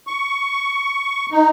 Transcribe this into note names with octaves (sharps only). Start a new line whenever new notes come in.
C#6
D#4